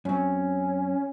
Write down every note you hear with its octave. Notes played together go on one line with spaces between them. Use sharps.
F#2 C4 C#4